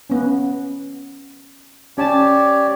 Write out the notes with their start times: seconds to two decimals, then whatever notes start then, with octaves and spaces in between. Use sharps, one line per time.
0.10 B3 C#4
1.98 C#4 G4 C#5 D5 A5